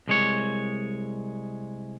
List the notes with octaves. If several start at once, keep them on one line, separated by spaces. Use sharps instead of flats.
C2 G#3 C#5